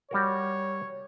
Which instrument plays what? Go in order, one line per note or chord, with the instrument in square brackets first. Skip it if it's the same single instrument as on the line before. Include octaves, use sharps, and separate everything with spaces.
[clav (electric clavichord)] G3 F#4 A#4 [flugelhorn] C#5